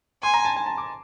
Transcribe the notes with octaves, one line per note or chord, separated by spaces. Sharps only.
G#5 C6
A#5
A5
G#5
A5
D6